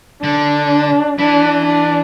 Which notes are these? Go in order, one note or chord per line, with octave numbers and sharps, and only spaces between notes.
D3 D4
E3 D4
D4